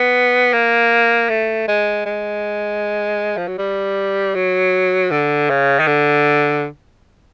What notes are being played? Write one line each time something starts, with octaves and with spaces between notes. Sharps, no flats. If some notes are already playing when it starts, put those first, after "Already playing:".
Already playing: B3
A#3
A3
G#3
G#3
F3
F#3
G3
F#3
D3
C#3
D#3
D3